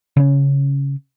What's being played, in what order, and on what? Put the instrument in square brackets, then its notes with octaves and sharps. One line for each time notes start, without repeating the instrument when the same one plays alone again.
[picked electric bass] C#3 C#4